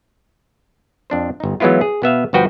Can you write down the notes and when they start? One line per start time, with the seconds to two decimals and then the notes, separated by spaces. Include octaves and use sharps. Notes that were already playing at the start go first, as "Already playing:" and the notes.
1.10 F2 D4 C5
1.40 G1 D#4
1.60 E3 F#3 G#3 B3 E4 F4
1.81 G#4
2.02 B2 B3 E5 F5
2.33 G1 G2 F3 F#4 B4 G5